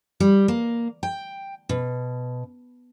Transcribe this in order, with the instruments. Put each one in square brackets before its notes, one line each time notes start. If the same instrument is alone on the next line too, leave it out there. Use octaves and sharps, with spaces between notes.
[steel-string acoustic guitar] G3
A#3
G5
B2